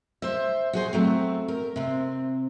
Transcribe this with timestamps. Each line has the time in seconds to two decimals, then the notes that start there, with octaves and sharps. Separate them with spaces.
0.22 C5 E5
0.73 F#4 G#4 C5
0.93 F#3 A3 C4
1.48 A#4
1.76 C3 C4